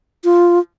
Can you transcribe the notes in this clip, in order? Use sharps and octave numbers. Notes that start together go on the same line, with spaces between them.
F4